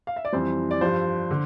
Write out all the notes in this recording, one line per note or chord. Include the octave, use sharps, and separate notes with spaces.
F5
E5
D5
F2 E3 G3 C5
D5
G2 F3 C5
D3